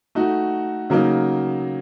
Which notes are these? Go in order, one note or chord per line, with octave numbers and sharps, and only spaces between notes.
A3 D#4 F#4
C#3 F#3 A#3 D#4